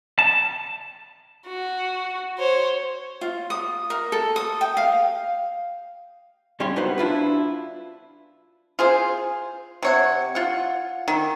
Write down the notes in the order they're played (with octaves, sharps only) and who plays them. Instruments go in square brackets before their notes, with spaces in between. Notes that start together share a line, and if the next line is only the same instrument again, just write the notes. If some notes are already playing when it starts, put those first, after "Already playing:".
[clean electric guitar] A5
[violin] F#4
C5 C#5
[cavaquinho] F4
D#6
A#4
A4
D#6
G5
F5
[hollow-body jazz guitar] G2 G3 C#4 G4 C#5 C6
C2 D#4 F#4 B4 C5
D4 E4 F4 B4
[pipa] F4 G#4 C5
C3 C#5 F#5
F4 F#5
D#3